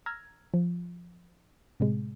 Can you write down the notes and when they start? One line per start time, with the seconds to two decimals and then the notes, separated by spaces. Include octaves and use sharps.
0.06 A#5 E6 F6 G#6 A#6
0.54 F3
1.80 A2 C3 G#3